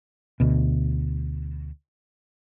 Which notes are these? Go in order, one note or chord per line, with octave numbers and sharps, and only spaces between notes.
D2 B2